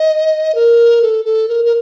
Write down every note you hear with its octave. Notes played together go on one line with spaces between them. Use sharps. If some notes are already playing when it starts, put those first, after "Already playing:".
Already playing: D#5
A#4
A4
A4
A#4
A#4